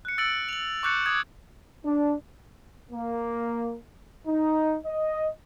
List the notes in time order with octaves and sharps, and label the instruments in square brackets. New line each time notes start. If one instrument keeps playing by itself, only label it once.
[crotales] F#6 C#7
E6 A6 C#7 D7 F#7
F7 F#7
C#6 D6 F#6 G6 A6 C#7
D6 D#6 G#6
[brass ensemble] D4
A#3
D#4
D#5